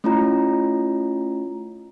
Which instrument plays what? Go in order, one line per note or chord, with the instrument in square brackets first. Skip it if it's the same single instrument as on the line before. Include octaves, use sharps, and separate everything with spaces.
[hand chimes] A3 C#4 E4 F4 C#5 A#5